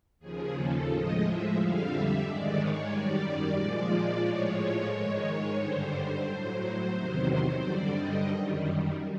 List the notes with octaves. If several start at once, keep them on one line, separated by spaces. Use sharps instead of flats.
D#2 C#3 F3 G#4
A4
A2 F3 G#3 D#5
E5
F2 D3 G3 F5
E5
G#2 D#3 G#3 D5
C#5
F#2 D#3 G3 D5
A#2 F3 G#3
A2 F3 G#3 C#5
G#2 D#3 G#3
G2 D3 G3 C5
A2 F#3
E2 C3 D#3 F#3
G2 D3 G3 D5
D#5
F#2 D#3 G3